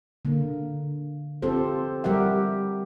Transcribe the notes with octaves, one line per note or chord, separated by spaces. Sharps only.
D3 A#3
C4 F4 G4 A4 C5
G3 G4 A#4 E5 F#5